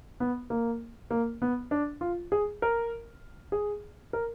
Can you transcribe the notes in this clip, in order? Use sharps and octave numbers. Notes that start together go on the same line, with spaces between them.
B3
A#3
A#3
B3
D4
F4
G#4
A#4
G#4
A#4